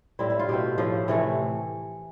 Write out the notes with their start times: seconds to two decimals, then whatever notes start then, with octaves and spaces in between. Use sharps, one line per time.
0.19 A2 G3 C4 E4
0.30 E4
0.39 F4
0.49 B2 A3 C4 G4
0.78 A2 F3 C4
1.08 C3 E3 A3